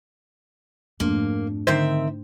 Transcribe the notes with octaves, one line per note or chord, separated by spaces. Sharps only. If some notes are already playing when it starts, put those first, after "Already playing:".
F2 G#2 A3 A#3 D4
D3 D#3 C4 C5 E5